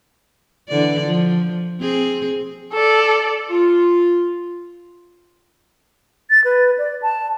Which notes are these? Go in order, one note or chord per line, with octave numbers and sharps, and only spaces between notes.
D3 E3 D5
F3
C4 G#4
A4 D5
F4
A6
B4
D5
A5